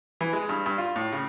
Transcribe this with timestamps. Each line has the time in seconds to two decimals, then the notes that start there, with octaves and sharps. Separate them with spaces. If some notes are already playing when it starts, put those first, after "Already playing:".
0.21 E3
0.33 G#3
0.49 G2
0.66 G2
0.78 F4
0.96 A2
1.12 C#3